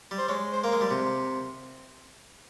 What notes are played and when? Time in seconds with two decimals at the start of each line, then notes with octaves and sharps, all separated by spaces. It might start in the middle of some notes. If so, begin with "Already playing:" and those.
0.11 G3
0.18 C5
0.29 G#3 C#5
0.53 C5
0.64 A#3 A#4
0.72 G#3
0.81 G3
0.91 C3